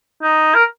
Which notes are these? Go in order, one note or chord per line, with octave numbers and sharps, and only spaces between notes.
D#4
A#4